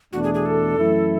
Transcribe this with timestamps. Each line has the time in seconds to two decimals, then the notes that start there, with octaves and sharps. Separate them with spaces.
0.12 E2 B2 A3 D4 F#4
0.24 G#4
0.34 G#4
0.46 A4
0.78 F#2 E3 A3 E4